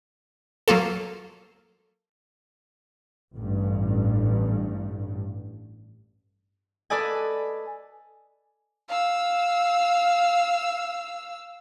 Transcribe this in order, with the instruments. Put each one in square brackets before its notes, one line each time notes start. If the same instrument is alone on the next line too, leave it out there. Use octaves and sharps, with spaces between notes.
[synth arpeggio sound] F#3 A#3 F4 A4
[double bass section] A1 G2
[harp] A4 B4 D5 D#5 G#5
[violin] F5 E6